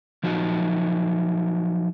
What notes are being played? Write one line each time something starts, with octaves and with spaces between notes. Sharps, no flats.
F3 F#3 D#4 F#4